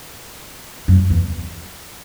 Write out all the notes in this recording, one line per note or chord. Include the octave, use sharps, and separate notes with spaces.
F#2
E2